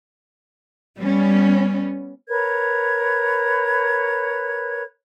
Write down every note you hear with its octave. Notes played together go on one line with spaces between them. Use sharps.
G3 B3 C#4
A#4 B4 C#5 G#6